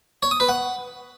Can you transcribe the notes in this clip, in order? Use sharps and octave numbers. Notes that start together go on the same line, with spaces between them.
C#5
D#6
B4
F#5